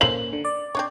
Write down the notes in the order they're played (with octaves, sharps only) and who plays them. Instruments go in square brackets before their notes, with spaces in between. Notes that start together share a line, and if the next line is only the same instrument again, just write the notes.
[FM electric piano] A#3 C#4 [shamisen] A4 C5 F5 [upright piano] F#7
[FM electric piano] D3
D5
[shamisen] C4 D4 C#5